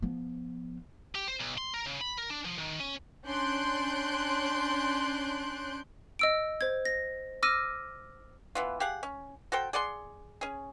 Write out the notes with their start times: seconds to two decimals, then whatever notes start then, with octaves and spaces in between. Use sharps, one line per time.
0.02 F3 B3
1.15 G4
1.28 C5
1.39 B1
1.58 C6
1.74 A#4
1.86 C#3
2.01 B5
2.18 A#4
2.30 D4
2.45 F3
2.59 D#3
2.80 C#4
3.25 C#4 D4 C6 F#6 G6 D7
6.19 D#5 E6 D7
6.61 C5 G#6
6.85 A#6
7.43 D6 E6 F6 A#6 D#7
8.55 E3 B3 F4
8.80 G4 G#4 F5 F#5
9.03 C#4
9.52 F#4 A4 C5 G5
9.73 G#4 D5 F#5 C6
10.41 C#4 G#4